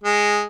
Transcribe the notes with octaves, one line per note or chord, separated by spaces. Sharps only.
G#3